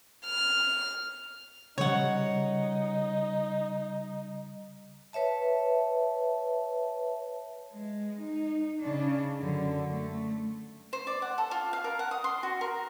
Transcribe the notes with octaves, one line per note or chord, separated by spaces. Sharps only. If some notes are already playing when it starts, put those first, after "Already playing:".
F6
C#3 G3 D#4 C#5 F#5
B4 C#5 E5 A5
G#3
D#4
C#3 D4
F#2 D3
A3
C5
D5
F#5
A4
F4
F5
A#4
F#5
D#6
C6
F#4
A#4